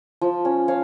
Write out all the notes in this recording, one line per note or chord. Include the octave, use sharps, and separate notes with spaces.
F3
C#4
F3 C#5 F5